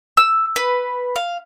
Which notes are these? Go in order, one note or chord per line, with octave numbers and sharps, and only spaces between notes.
E6
B4
F5